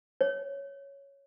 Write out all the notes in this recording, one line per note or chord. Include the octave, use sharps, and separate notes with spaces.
C#5